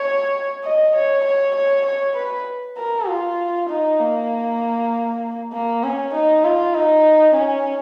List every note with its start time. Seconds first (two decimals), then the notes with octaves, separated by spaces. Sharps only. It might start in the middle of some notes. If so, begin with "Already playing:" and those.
Already playing: C#5
0.64 D#5
0.95 C#5
1.25 C#5
1.56 C#5
1.86 C#5
2.16 B4
2.78 A#4
3.08 F4
3.69 D#4
4.00 A#3
5.53 A#3
5.84 C#4
6.14 D#4
6.44 F4
6.74 D#4
7.35 C#4